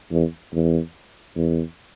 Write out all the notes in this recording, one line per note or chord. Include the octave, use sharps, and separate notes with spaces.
E2
E2
E2